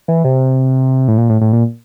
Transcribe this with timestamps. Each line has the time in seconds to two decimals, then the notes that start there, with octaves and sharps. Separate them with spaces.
0.08 E3
0.24 C3
1.08 A2
1.18 A#2
1.29 A2
1.41 A2
1.53 A#2